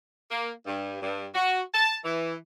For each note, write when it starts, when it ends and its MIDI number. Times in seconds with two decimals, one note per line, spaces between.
0.30 0.52 58
0.66 0.98 43
1.02 1.26 43
1.35 1.61 66
1.74 1.96 81
2.04 2.34 52